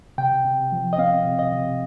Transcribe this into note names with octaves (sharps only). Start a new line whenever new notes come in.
C3 G5
C3
F3
D#5
C4 F5
C3
D#5
C3